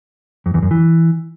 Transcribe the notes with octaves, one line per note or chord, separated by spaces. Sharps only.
F2
E2
F#2
E3